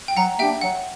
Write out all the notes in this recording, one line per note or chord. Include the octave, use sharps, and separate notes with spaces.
G5
F#3 F#5 A#5
A#3 D4 G4 E5 G5
F#3 F#5